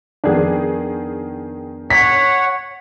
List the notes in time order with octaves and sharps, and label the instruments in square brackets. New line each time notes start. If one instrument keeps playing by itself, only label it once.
[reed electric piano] F2 B3 D4 [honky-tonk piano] D#3 G#4
[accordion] C#5 F#5 [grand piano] B6